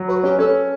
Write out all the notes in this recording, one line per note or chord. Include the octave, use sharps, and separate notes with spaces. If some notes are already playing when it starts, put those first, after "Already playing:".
Already playing: F#3
F#4 B4
C#4 G4
C#4 A4